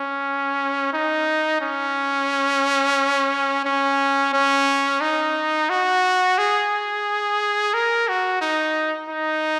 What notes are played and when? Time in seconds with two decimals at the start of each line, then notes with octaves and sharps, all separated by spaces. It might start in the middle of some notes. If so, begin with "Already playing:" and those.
Already playing: C#4
0.93 D#4
1.61 C#4
3.65 C#4
4.34 C#4
5.01 D#4
5.70 F#4
6.38 G#4
7.74 A#4
8.08 F#4
8.42 D#4
9.10 D#4